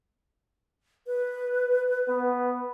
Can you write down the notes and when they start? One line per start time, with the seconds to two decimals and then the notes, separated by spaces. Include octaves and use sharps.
1.07 B4
2.08 B3